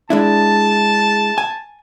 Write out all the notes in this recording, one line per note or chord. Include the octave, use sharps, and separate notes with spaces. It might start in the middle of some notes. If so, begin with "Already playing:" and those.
G#3 D4 E4 A5
G#5